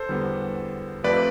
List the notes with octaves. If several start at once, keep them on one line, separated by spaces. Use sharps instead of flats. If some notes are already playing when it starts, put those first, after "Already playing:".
Already playing: A4 C5
E2 D3 G3 B3
F2 C3 F3 A3 B4 D5